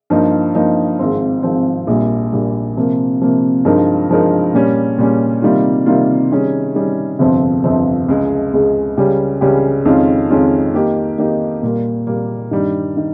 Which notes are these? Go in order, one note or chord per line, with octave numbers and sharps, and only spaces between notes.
G2 F3 A#3 D#4
G2 F3 A#3 D#4
G#1 G#2 F3 C4
G#1 G#2 F3 C4
A#1 A#2 G3
A#1 A#2 G3
C3 F3 A#3
C3 F3 A#3
G2 F3 G#3 D#4 A#4
G2 F3 G#3 D#4 A#4
A#2 G3 C#4
A#2 G3 C#4
C3 D#3 G3 A#3 F4
C3 D#3 G3 A#3 F4
D#3 G3 C#4 G#4
D#3 G3 C#4 G#4
G1 F2 C3 F3 C4
G1 F2 C3 F3 C4
C#2 C#3 G#3
C#2 C#3 G#3
C#2 C#3 G3 C#4 G4
C#2 C#3 G3 C#4 G4
F2 D#3 G#3 C#4 F4
F2 D#3 G#3 C#4 F4
D#3 A#3 D#4 G4
D#3 A#3 D#4 G4
A#2 G3 A#3
A#2 G3 A#3
G2 D#3 G3
D#3